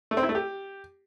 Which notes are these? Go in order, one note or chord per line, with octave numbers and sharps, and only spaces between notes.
A3
C4
E4
A3
G4